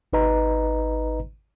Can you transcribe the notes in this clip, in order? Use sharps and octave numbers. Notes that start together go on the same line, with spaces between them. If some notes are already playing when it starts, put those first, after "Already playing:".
G#1 D#4 B4 D#5 A#5